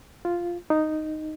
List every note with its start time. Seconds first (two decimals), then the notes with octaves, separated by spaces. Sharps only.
0.25 F4
0.70 D#4